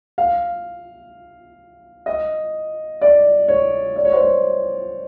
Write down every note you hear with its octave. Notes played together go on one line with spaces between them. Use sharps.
F5
D#5
D5
C#5
D5
C#5
C5
C#5